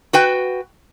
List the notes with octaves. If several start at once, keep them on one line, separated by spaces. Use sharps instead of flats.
F#4 B4 G5